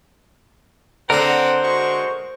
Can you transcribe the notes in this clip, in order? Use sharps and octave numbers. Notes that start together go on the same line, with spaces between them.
D3 C4 A#4 C5 F#5 A#5
G#3 F#4 C#6